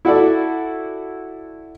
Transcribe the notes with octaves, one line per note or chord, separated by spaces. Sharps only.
E4 F#4 A4 D5